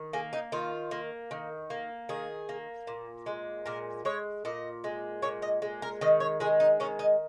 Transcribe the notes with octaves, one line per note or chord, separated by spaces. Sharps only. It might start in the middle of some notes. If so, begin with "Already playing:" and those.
Already playing: D#3
A#3 G#4
D#4
D#3 F4
A#3
D#3
A#3
D#3 G#4
A#3
A#2
G#3
A#2 A#4
G#3 C#5
A#2 D#5
G#3
A#2 C#5
D#5
G#3
A#4
D#3 D#5
C#5
G#3 G#4
D#4
D#3 C#4
D#4